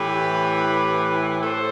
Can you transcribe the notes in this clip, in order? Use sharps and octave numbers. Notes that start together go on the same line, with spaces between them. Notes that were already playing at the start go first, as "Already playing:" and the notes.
Already playing: A2 E3 G4 B4
A2 A4 C5